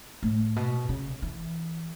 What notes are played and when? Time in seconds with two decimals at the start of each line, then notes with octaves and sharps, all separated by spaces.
0.23 A2
0.56 B2
0.89 C#3
1.22 E3